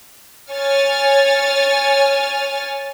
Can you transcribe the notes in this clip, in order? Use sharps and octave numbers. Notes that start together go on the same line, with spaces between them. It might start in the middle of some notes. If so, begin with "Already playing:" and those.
C#5 G#5 F6 A6